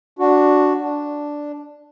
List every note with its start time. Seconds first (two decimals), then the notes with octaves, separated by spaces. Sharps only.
0.19 D4 F#4
0.81 D4